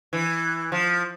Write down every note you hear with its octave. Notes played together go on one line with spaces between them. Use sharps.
E3
F3